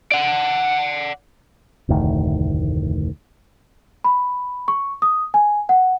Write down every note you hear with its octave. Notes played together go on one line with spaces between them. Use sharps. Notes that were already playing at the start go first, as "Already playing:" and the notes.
D5 F#5
F1 D2 A2 D#3
B5
C#6
D#6
G#5
F#5